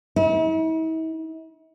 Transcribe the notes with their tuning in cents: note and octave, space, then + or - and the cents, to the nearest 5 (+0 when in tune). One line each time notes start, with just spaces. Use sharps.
E4 -45